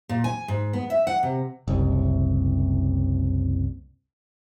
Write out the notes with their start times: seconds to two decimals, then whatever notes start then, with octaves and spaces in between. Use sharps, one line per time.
0.09 A#2
0.24 G#5
0.48 G#2
0.73 B3
0.90 E5
1.07 F#5
1.23 C3
1.68 F#1 C2